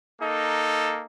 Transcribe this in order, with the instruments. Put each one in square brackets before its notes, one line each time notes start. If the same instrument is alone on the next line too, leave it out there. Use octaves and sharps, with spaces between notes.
[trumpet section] A#3 D#4 A4